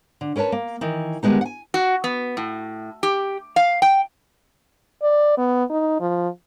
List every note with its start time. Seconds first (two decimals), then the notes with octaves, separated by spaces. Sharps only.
0.21 D3
0.36 C#4 A#4 B4 C#5 A5
0.52 A#3
0.81 D#3 E3
1.23 D3 D#3 G3 G#3 B3 D#4
1.41 F#5 G#5
1.74 F#4
2.04 B3
2.37 A2
3.03 G4
3.56 F5
3.82 G5
5.02 D5
5.38 B3
5.70 D#4
6.00 F3